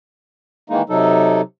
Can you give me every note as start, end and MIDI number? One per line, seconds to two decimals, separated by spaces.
0.70 0.82 51
0.70 0.82 52
0.70 0.82 56
0.70 0.82 58
0.70 0.82 63
0.89 1.41 48
0.89 1.41 54
0.89 1.41 63
0.89 1.41 69